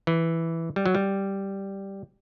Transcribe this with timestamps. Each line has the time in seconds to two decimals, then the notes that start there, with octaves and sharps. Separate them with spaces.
0.07 E3
0.76 G3
0.86 F#3
0.95 G3